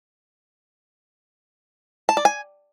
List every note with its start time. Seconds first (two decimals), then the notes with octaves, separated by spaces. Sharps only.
2.09 A5
2.17 D5
2.25 G#5